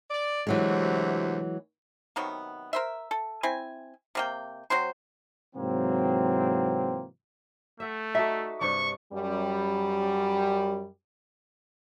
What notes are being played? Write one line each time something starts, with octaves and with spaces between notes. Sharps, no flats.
D5
D2 C3 E3 F#3 G#3
C3 D#3 F#3 B3
A#4 C5 E5
A4
C4 E4 G#5
C3 A#3 G5
F#3 C4 C5
G#2 C3 E3 F#3 A#3 C4
A3 E5 F#5
D#4 F#4 A4 D5 E5
G2 C3 D4 C#6
F#2 G3